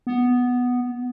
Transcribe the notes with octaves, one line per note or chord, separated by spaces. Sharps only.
B3